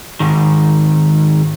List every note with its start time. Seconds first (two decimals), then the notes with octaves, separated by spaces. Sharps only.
0.20 G#2 D#3